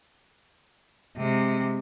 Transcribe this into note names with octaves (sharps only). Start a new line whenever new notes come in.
C3 G#3